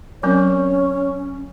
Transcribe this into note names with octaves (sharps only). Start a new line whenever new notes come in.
F#3 C4 C#4 A#4 C#5